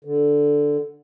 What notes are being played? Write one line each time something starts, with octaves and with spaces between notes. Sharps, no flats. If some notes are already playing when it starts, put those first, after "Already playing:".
D3